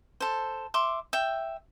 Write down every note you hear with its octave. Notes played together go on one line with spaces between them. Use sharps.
A4 C5
E5 C6 D6
E5 G5